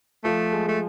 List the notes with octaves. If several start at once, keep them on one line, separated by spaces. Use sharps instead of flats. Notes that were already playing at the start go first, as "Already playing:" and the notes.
F3 A3
G#3
A3